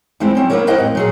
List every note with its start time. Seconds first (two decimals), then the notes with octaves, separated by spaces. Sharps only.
0.20 E2 G3 G#3 C4 E4
0.35 F#3 C4 C#4
0.50 A#3 B3 D4 E4 A#4 C#5
0.67 E4 G4 A#4 C5 D#5 F#5
0.78 F2 A2
0.95 A#2 F#3 G#4